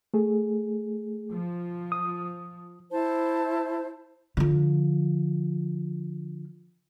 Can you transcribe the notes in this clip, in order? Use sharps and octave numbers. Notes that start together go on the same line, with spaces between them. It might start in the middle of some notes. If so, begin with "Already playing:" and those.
A3 G#4
F3
D#6
E4 C5 A5
D3 F3